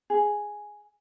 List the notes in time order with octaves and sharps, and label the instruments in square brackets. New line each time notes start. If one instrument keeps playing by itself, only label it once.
[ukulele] G#4